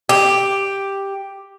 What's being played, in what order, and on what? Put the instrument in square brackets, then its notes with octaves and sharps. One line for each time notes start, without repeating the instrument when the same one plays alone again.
[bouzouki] G4